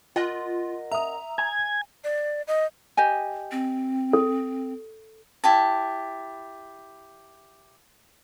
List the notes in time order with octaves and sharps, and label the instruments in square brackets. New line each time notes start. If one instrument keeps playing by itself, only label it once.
[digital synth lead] F4 [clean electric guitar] A#4 D#5 F#5
[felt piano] E5 D#6 [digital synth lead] A#5
[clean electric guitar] G#5 [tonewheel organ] G#6
[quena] D5
D#5
[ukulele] G4 D#5 G#5
[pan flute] C4
[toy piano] A4
[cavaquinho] E4 G4 A5